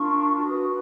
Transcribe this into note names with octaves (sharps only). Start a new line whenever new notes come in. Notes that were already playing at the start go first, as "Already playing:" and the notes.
Already playing: D4 F4 A#4 C#6
F#4 B4 D#6